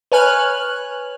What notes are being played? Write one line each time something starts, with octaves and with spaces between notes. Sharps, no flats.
B4 C#5 G#5 F6 F#6